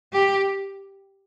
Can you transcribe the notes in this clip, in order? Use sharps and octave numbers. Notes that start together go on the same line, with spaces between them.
G4